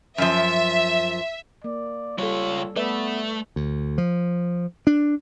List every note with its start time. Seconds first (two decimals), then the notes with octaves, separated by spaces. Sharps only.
0.18 F#2 F3 E5
1.64 A#3 D5
2.18 C#2 G3 F4 A4 C#5
2.77 A3 B3 B4 D5 E5
3.56 D2
3.98 F3
4.87 D4